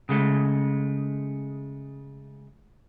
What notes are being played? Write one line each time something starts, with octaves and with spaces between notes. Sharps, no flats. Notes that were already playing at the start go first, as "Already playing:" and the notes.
C#3 G#3 A3